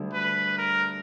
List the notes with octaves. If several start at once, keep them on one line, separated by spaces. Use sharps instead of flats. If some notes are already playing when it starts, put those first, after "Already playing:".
Already playing: D2 D3 G3
B4
A#4